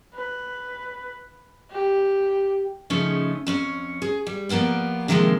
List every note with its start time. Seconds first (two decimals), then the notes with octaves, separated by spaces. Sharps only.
0.15 B4
1.71 G4
2.90 C#3 F3 A3 C#4 D#4
3.47 F2 C#4 C#5
4.02 G#4
4.27 G3
4.49 F3 A#3 B3 F4 D5
5.08 C3 D#3 F3 G#3 A#3 C4